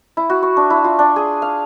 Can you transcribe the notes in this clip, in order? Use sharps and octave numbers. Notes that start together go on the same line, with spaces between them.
E4
F#4
C#6
D4
E4
F4
D4
G#4
F5